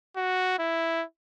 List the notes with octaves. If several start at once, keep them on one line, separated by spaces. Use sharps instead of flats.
F#4
E4